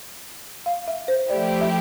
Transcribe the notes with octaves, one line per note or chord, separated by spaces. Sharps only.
F5
E5
C5
F3 A3 E4 G4 D5
E5